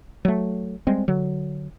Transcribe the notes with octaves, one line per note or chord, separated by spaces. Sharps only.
F#3 A3
G3 G#3 C4
D3 F#3